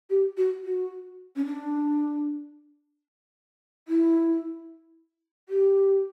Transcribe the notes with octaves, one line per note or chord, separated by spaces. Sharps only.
G4
F#4
F#4
C#4
D4
E4
G4